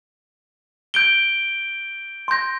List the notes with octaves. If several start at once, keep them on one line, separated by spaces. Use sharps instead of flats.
G6 D7 G7
C6 G6 A#6